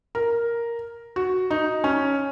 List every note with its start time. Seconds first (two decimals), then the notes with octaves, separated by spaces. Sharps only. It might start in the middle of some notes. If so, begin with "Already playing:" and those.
0.15 A#4
1.16 F#4
1.51 D#4
1.84 C#4